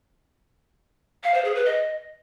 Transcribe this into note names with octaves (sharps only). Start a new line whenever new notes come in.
F5
C5
G#4
B4
D#5